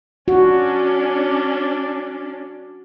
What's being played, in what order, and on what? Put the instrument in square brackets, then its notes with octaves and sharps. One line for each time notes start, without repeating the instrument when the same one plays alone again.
[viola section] C#4 D4 [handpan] F#4